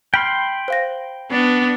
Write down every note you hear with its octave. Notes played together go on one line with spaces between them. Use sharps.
G5 B5 C6 F6 F#6 B6
C5 F5 A#6
B3 D4